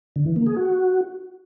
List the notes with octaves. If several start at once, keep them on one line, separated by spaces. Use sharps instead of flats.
D3
E3
A#3
G#4
F#4